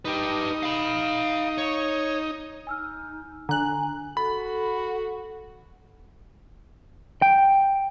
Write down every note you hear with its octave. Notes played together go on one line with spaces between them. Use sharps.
D#4 G4 B4
F5 B5
C#5
D#4 G#5 E6 F6
D3 G#5 A#5 F#6
F#4 A4 B5
G5